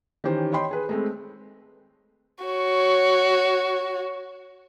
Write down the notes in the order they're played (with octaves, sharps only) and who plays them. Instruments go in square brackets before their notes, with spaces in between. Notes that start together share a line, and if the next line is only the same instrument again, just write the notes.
[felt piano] D#3 E3 C#4 G4 C5
C#5 D#5 G5 B5 C6
G#4 B4
G#3 A3 C4
[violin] F#4 C#5